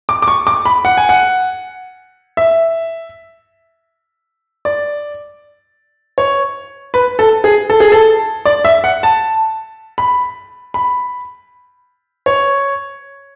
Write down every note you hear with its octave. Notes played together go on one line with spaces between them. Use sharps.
D6
D6
C#6
D6
B5
F#5
G#5
F#5
E5
D5
C#5
B4
A4
G#4
A4
G#4
A4
D5
E5
F#5
A5
B5
B5
C#5